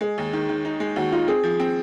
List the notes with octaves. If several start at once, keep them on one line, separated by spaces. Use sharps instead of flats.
G#3 G#4
D#2
D#3
D#3
D#4
G#3
D#2 F#4
D#4 F4
C4 G#4
F3
C4